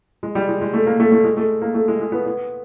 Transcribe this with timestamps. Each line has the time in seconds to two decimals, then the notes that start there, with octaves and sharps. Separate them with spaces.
0.23 G#3
0.35 G3
0.48 G#3
0.61 G#3
0.74 A3
0.86 A#3
1.00 A3
1.12 A3
1.24 G#3
1.37 A3
1.62 A#3
1.74 A3
1.88 G#3
2.01 G#3
2.12 B3
2.26 B3